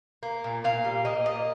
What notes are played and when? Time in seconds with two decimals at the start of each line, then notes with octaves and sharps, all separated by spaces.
0.23 A#3
0.44 A#2
0.64 A#2 F5
0.84 G3
1.05 A#3 D#5
1.26 A#2 D#5